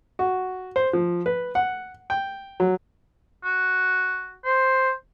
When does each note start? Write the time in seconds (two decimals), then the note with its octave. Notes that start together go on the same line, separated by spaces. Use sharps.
0.19 F#4
0.76 C5
0.93 F3
1.26 B4
1.55 F#5
2.10 G5
2.60 F#3
3.44 F#4
4.45 C5